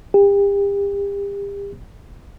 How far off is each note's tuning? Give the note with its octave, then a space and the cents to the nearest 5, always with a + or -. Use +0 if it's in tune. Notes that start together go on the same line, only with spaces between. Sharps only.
G4 +35